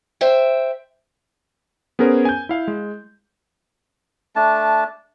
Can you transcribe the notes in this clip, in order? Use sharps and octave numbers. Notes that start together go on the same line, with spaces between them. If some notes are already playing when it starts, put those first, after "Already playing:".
C5 E5 G5
B3 C#4 G#4 A#4 C5
G#5 G6
E4 F5
G#3
A3 D4 A5